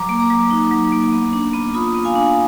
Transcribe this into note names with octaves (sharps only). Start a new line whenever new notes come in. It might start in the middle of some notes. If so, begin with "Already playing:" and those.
Already playing: F#3 A#5 D6
A#3
A#5 D6
F#3
D#4
F#3
A#3
B3
D4
B3
F4 B5 D#6
B3
F5 G#5
D4